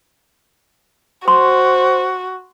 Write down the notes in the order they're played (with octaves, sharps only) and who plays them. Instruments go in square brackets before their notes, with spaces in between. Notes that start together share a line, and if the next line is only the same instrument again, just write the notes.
[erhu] F#4 [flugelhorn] C5 [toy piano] C6